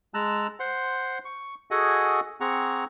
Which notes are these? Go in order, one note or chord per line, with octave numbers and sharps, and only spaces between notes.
G#3 A5 A#5 E6 F#6
C5 F#5 C6
C#6
F#4 G#4 A4 D#5 F#5 G#5
C4 G#4 F#5 A#5 C#6